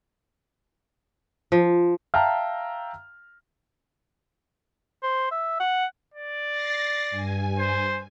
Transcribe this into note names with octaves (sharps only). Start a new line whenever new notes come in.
F3
E5 F5 G5 A5 A#5 F6
C5
E5
F#5
D5
A6 A#6 C7
G2 G#5
C5